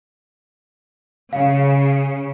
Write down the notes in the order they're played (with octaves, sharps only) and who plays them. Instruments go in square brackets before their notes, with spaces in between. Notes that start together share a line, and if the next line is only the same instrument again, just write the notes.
[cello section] C#3 [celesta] F5